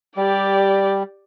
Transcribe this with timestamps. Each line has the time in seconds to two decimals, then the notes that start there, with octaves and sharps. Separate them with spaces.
0.17 G3 G4 D5